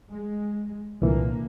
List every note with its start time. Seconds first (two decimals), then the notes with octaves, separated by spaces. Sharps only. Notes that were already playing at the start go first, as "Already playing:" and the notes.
0.10 G#3
1.02 C2 A#2 D3 E3 A#3